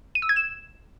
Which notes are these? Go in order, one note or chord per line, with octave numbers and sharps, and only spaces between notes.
D#7
E6
G#6
E7